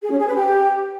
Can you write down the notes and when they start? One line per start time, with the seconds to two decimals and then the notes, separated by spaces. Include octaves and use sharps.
0.02 G#4
0.11 C#4
0.19 G#4
0.27 B4
0.35 G4